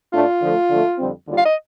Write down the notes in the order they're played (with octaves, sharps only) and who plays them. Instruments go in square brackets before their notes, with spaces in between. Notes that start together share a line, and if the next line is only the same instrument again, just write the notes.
[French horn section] A2 A3 D4 [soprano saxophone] F4
[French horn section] D3 F3 A3
D3 F3 A3
F2 D3 G3 C4
D#2 D3 G3 D4 F4
[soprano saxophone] F5
D#5